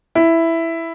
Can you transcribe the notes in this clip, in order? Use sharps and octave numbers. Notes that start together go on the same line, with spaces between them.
E4